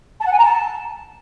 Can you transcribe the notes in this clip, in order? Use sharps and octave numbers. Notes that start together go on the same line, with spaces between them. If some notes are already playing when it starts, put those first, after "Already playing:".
A5
F#5
G#5
A#5
A5